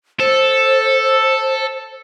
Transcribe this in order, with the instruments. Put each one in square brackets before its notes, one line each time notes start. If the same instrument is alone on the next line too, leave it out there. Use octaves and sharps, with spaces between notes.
[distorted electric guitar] A4 [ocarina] C5